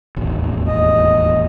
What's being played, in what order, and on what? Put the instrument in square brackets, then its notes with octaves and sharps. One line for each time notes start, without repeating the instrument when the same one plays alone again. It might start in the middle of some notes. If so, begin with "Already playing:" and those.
[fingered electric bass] E1 A1 D#2
[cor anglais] D#5